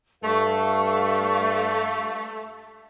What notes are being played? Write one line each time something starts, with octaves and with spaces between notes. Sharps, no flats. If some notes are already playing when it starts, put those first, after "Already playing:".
G2 A3 A4 F5 C#6